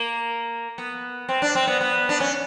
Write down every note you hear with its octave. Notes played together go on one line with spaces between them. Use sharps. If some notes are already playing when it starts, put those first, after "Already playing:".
Already playing: A#3
B3
C4
D4
C4
B3
B3
D4
C#4